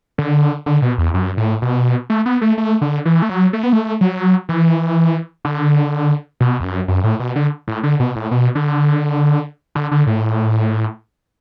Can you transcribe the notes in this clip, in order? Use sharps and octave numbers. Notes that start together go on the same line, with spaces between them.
D3
D3
B2
E2
F#2
A2
B2
A3
B3
A3
A3
D3
E3
A3
F#3
A3
B3
A3
F#3
E3
D3
B2
E2
F#2
F#2
A2
B2
D3
A2
D3
B2
A2
B2
D3
D3
D3
A2